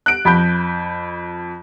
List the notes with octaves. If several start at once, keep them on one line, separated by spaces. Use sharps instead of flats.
F#6 D7
F2 B5 G6